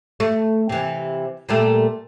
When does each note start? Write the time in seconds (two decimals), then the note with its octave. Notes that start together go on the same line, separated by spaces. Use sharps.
0.20 A3
0.69 C3 E3
1.49 A#2 G3 A3